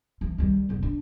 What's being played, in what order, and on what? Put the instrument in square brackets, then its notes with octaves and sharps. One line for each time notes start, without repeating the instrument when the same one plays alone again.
[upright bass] E3
D#3 G3
F1 B3
D4